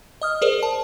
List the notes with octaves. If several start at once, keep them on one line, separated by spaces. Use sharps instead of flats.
D#5 D#6 F6
G#4 A#4 C5 D5
A5